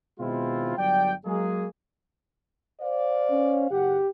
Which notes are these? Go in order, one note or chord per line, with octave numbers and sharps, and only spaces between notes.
B2 D#3 G#3 C4 E4 F4
G1 F#3 G3 D5 G5
F#3 G#3 A#3 G#4
C5 D5 F5
C#4
F#1 G4 F#5